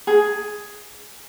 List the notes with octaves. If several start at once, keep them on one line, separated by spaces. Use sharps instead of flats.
G#4